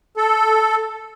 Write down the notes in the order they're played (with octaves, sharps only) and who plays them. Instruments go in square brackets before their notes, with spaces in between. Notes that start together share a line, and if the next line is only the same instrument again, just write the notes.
[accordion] A4